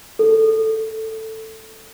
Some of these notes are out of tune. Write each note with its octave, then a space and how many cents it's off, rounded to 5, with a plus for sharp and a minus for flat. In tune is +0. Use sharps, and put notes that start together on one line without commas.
A4 +5